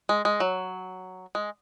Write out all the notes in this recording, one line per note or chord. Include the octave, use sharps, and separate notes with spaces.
G#3
G#3
F#3
G#3